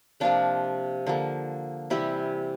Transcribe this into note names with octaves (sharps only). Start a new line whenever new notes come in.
C3 F3 A#3 D4 F4
D3 F3 A#3
C3 E3 G3 E4 G4